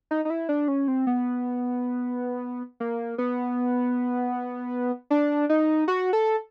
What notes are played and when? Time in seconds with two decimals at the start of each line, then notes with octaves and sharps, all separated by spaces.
0.11 D#4
0.25 D#4
0.30 E4
0.49 D4
0.68 C#4
0.88 C4
1.07 B3
2.80 A#3
3.18 B3
5.10 D4
5.49 D#4
5.88 F#4
6.13 A4